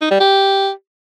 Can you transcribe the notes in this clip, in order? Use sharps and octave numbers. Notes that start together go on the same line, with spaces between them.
D#4
G3
G4